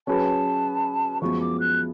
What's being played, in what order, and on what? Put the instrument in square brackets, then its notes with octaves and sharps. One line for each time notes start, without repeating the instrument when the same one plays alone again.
[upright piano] F#3 C#4 G#4 B4 [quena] A5
[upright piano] F#2 F3 G#3 B3 [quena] C#6
[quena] D6
F#6